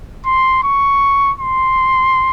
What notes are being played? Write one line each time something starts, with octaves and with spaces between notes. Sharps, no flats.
C6
C#6
C6